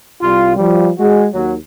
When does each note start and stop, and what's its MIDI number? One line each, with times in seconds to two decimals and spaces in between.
0.21 0.55 36
0.21 0.55 55
0.21 0.55 65
0.56 0.89 53
0.56 0.89 55
0.98 1.25 56
0.98 1.25 66
1.33 1.55 39
1.33 1.55 54